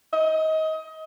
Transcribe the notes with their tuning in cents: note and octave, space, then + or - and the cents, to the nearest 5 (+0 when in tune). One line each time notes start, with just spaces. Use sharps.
D#5 +25